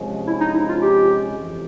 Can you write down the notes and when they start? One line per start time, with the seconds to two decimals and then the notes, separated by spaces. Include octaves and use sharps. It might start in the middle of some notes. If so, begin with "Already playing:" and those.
Already playing: C3 F3 G#3 C#4
0.27 E4
0.40 D#4
0.54 E4
0.69 F4
0.82 G4
1.37 F2 E3